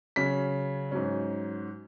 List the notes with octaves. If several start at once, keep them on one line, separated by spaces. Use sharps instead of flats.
C#3 F#3 C#4 B6
G#2 F#3 C#4